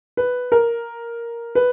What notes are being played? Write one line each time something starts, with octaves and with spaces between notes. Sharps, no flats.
B4
A#4
B4